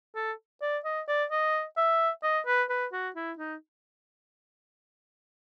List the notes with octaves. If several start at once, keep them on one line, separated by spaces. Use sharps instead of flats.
A4
D5
D#5
D5
D#5
E5
D#5
B4
B4
F#4
E4
D#4